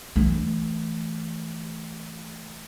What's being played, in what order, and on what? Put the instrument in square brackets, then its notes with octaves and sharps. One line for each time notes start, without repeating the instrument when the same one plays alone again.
[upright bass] E3 A3